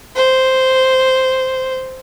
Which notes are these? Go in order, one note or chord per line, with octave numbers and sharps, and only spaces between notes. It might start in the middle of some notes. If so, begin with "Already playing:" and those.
C5